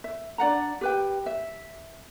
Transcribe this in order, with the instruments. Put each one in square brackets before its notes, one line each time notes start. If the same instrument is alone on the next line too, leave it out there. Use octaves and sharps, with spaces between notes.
[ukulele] E5
D4 D5 F#5 A#5
G4 B4 G5
E5